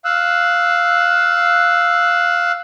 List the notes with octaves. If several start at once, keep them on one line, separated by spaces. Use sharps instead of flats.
F5 E6 F#6